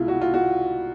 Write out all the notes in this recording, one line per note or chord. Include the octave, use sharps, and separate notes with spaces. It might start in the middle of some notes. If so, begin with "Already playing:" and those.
Already playing: C2 B2 G#3 E4 F4
F#4
F4
F#4